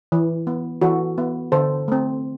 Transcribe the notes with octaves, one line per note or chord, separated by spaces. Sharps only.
E3
B3
E3 F#4 A4
B3
D3 A4 C5
A3 C4